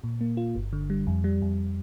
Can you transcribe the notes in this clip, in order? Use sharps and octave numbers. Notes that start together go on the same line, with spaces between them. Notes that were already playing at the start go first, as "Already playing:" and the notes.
A#2
A#3
F4
G1
D3
G3
F2
G3
F2